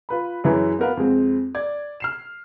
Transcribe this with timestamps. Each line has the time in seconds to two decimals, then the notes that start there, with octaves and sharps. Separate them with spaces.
0.09 F4 B4 B5
0.44 F#2 E3 E4 G#4 B4 C#5
0.79 B3 F#4 A#4 B4 F5
0.97 F2 G#3 C4
1.55 D5 G#6
2.00 F6 C7 E7